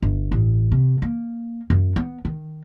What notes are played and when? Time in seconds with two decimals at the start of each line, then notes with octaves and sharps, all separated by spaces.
0.02 G1
0.31 A1
0.72 C3
1.02 A#3
1.70 F#2
1.96 B3
2.25 D#3